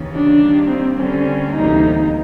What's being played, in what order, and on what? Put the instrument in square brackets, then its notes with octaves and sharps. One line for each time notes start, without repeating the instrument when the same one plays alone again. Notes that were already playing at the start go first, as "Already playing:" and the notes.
Already playing: [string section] D#2 C#3 E3
[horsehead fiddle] D4
[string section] D#3 G3 A#3
[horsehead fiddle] C4
[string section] D3 G3 C4 [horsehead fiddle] C#4
[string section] D2 C3 E3 G3 A#3 [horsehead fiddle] D#4